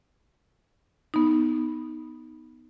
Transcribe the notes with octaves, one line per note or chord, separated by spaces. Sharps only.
B3 D#4